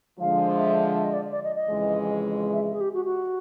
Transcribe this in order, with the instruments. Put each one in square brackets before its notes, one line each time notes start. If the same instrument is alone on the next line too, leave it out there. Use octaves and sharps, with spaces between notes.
[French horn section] D3 F3 G#3 [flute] F5
[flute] E5
E5
D#5
D5
D5
D#5
D#5
[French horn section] F2 C#3 E3 G#3
[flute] E5
G#4
G4
F#4
F#4